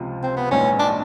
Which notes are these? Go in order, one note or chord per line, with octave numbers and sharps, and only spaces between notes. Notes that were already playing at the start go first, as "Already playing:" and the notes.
Already playing: C#2 C3 F3
C4
B3
A#1 G#2 E3 C#4
D4